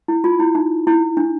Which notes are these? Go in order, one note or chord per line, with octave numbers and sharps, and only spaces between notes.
E4
F4
E4
D#4
E4
D4